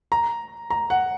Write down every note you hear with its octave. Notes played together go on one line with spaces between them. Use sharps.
A#5
A#5
F#5